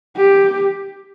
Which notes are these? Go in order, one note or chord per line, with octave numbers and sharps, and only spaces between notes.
G4